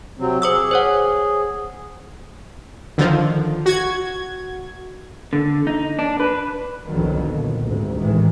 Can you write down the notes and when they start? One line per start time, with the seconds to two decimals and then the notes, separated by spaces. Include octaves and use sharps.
0.19 C3 F#3 C4
0.42 G#4 C5 D6 E6
0.71 C5 C#5 F#5
2.98 D3 D#3 F3
3.66 F#4 G#6
5.33 D3
5.67 D#4
5.99 D4
6.20 B4
6.88 C2 F2 B2 D3 D#3 F#3
7.28 A#1
7.66 D2 G#2 C3
7.97 A1 G#2 D#3 E3 G#3